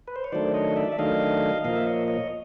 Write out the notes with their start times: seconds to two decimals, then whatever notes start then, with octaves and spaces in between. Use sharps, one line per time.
0.08 B4
0.16 C5
0.24 C#5
0.32 D#3 F#3 A3 D4 C5 D5
0.54 C#5 D#5
0.76 D5 E5
0.92 E5
0.98 D#3 F#3 A3 D4 D#5 F5
1.64 A#2 F3 A#3 D#5 F5
1.76 E5
1.87 C#5 D#5
2.08 C#5 D#5